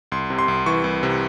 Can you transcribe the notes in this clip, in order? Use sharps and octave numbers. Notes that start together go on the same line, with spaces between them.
C2 C6
C3
C6
C2
E3 C#6
C2
C3